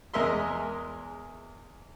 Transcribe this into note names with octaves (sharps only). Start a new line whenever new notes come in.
E2 G#3 A#4 D#5 E5 C6